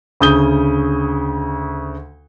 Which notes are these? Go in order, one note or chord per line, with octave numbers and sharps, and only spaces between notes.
D2 C#3 D#6 G6 G7